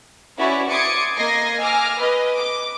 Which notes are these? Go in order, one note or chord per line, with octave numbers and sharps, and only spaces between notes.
C#4 E4 F#4 B4 C#5 D5
C6 D6 D#6 G#6 A6 C#7
A#3 D#5 G#6 A#6 C7
G#5 D6 E6 F6 A#6
B4 D#5
D6